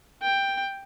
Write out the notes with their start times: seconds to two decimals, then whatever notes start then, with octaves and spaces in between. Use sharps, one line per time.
0.22 G5